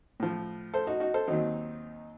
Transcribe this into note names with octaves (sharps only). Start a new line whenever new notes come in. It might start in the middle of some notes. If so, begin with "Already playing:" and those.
A2 F3
A4 C5
D#4 F#4
D#4 F#4
A4 C5
D#2 D#3 F#3 C4 D#4